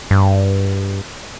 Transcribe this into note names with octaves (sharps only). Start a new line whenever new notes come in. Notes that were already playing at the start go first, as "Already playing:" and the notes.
G2